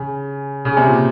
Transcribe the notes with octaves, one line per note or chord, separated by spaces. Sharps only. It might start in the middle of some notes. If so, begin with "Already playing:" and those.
Already playing: C#3
C#3
C3
A#2